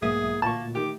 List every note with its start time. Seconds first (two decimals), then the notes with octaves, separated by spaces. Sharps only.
0.02 B1 E2 G#2 A#3 G#4 E5 D#6
0.42 D2 A#2 A#3 A5 C#6
0.75 D#3 G4 D6